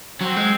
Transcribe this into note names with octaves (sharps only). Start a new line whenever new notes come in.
F#3 C4
G#3